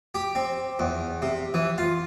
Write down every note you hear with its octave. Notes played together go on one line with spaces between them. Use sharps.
G4
C4
E2
C3
E3
F4